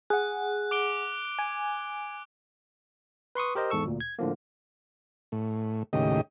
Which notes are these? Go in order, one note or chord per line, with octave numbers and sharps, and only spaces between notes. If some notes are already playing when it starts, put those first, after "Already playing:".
G#4 F#5 F#6
D6 D7 G7
G#5
B4 C6 C#6 D#6
G4 A#4 C5 D#5
E2 G#2 A4 C#6 E6
D2 A#2
G#6
A2 D3 F3 A#3
A2
D#2 A2 C#3 G4 D#5